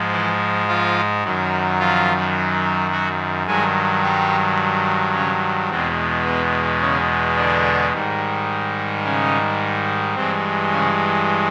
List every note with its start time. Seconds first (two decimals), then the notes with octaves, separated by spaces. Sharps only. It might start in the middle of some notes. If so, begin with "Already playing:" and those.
Already playing: G#2 F3 G#3
0.12 E3 E4
0.68 F3 F4
1.23 F#2 D#3 F#3
1.79 F3 F4
2.91 F#3 F#4
3.46 G2 D#3 F#3 G#3 G#4
4.03 G3 G4
5.13 C#3 C#4
5.69 E2 B2 G#3 C4
6.25 B3
6.81 C#3 C#4
7.36 D3 D4
7.93 G#2 D#3 G3
9.04 C#3 C#4
10.15 G2 E3 G#3 C4
10.71 C#3 C#4